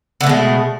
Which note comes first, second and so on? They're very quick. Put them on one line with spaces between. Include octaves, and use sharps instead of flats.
D3 A3 B2 G#3